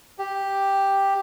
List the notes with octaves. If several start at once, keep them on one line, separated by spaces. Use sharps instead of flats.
G4